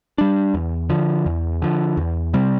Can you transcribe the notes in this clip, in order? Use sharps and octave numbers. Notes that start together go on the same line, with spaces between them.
G3 D4
E2
D3 F3
E2
D3 F3
E2
C3 G3 C4